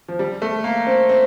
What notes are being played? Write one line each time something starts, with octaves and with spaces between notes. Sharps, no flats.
F3
G3
A3
A#3
C4
C4